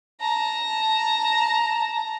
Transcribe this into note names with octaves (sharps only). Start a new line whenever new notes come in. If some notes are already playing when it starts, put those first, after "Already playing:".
A5 A#5